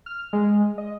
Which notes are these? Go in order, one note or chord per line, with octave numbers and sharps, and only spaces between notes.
F6
G#3
D#5